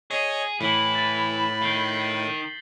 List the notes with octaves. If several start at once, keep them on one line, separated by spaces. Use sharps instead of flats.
G#4 C#5 D#5
A2 E3 B5 B6 F#7
A6
D#3 G6 C7 G7